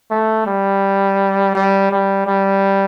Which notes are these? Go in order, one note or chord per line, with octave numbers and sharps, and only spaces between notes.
A3
G3
G3
G3
G3